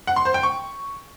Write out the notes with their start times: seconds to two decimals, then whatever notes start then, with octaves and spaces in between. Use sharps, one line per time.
0.07 F#5
0.16 C6
0.25 C5
0.34 G5
0.43 C#6